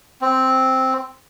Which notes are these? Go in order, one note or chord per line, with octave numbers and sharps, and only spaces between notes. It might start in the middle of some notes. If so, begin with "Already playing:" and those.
C4